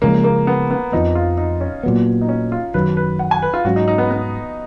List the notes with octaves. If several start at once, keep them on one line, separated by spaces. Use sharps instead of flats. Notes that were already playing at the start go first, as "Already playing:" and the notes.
C#3 F3 G#3 A#3 C#4
A#3
B3
B3
F2 F3 B3 D#4
F4
D#4
C#4
A#2 F#3 B3
D#4
C#4
F4
F#2 D#3 F#3 B4
B4
F#5
G#5
B4
F4
G#2 F#3 C#4 F#4
D#4
D#4
B3
B3